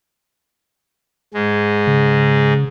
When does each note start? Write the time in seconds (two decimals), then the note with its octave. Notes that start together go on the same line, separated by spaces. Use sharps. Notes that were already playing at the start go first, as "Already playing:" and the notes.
1.34 G#2 G#3
1.87 C#3